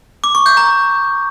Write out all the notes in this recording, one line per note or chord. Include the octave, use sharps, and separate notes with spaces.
D6
C#6
G6
A#5